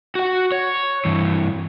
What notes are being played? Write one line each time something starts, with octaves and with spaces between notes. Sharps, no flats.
F#4 F#5
C#5
G2 E3